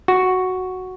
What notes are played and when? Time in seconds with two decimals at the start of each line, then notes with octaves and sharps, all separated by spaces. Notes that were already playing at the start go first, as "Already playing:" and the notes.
0.08 F#4